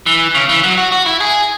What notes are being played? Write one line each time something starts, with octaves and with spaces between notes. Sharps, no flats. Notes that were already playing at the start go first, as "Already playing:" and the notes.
E3
C#3
E3
F#3
F#4
F#4
E4
G#4